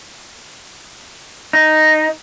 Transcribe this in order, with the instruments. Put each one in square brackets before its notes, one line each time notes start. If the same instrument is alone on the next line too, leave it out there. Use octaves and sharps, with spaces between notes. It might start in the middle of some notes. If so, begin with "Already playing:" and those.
[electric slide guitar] D#4